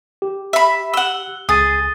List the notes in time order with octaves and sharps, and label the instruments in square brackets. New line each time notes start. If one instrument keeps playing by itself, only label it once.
[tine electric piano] G4
[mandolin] E5 B5
[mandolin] F#5 E6 [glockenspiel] G7
[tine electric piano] C#2 [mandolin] G#4 [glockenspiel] D#6 A6 D#7